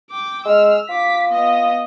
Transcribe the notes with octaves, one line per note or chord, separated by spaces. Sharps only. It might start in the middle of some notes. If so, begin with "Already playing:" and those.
G5 D6
G#3 E6 F6
F4 D6 B6
B3 D#5